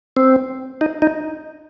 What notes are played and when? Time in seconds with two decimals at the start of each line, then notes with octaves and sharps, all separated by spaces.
0.17 C4
0.81 D#4
1.02 D#4